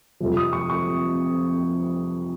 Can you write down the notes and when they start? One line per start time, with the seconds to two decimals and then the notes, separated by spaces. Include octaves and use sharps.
0.20 F2 C3 F3
0.37 D#6
0.53 C#6
0.70 C#6